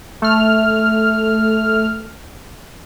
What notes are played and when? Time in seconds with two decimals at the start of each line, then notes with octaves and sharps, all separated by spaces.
0.22 A3 F6